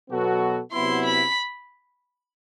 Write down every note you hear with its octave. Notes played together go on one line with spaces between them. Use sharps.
B2 F#3 B3 F#4 A4
C3 F#3 B3 E4 C6
B5